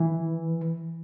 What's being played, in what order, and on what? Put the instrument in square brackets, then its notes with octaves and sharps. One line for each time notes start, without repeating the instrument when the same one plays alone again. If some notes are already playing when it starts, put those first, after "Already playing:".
Already playing: [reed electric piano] E3